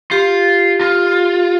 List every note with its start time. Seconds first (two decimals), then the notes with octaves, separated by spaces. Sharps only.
0.11 F4 G4
0.80 F4